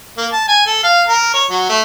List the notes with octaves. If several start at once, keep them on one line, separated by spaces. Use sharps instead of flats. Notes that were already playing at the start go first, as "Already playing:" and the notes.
A#3
A5
G#5
A4
F5
A#4
C#5
F#3
A3